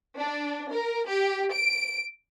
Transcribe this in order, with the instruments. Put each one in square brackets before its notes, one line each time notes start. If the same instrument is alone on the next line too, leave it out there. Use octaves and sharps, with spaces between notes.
[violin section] D4
A#4
G4
D7